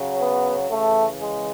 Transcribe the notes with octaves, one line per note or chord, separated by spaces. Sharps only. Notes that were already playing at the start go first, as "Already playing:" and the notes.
Already playing: C#3 F#3
B3
C#3 E3 A3
G#3